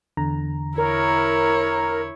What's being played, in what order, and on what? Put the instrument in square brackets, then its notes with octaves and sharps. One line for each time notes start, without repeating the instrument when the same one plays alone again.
[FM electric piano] E2 D3 A#5
[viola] E4 C#5 [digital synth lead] A#4